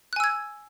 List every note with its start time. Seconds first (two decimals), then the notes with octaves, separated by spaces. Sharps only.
0.13 F#6
0.16 G#5
0.20 E6
0.24 G#6